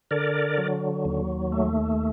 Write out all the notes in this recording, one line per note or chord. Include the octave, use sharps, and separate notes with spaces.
D3 A#4 D5
F#3
D#2
A3